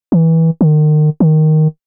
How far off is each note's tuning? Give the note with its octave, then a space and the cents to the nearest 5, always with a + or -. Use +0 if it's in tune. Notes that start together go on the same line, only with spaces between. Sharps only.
E3 -20
D#3 -35
D#3 +0